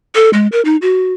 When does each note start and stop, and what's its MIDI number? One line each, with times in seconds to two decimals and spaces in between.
0.15 0.30 69
0.33 0.47 56
0.52 0.61 70
0.65 0.76 63
0.82 1.14 66